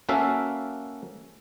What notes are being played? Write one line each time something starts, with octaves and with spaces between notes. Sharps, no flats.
A#3 C#4 F#4 A4 E5 F5